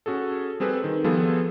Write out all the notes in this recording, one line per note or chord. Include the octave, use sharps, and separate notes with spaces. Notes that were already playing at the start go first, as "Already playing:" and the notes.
C#4 F#4 G#4 A4
G3 C4 G#4 A4 B4
D#3
F3 G3 B3 F4 G#4 A4